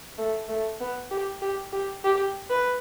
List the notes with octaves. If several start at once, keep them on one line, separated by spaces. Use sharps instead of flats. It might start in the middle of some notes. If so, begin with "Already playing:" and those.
A3
A3
B3
G4
G4
G4
G4
B4